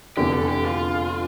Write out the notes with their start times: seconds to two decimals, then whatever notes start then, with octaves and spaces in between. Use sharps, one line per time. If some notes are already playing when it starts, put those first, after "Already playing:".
0.17 F1 E2 D3 G4
0.33 A4
0.49 G4
0.64 F4